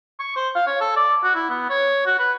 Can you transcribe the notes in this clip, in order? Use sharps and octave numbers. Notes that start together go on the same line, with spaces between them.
C#6
C5
F5
C#5
A4
D5
F#4
E4
B3
C#5
F#4
B4